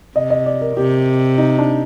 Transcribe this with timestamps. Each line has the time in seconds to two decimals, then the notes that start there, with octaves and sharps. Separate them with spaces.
0.15 C3 D#5
0.30 D#5
0.46 D5
0.61 A#4
0.76 C3 G4
1.38 D#4
1.58 D4